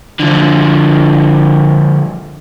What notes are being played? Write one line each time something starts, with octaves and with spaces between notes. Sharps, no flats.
D3 F3